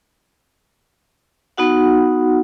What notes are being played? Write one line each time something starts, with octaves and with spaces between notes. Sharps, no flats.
B3 D#4 F#4 F#5